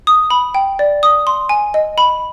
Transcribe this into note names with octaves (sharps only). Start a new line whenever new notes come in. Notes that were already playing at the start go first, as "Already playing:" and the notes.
D#6
B5
G5
D5
D#6
C6
G#5
D#5
B5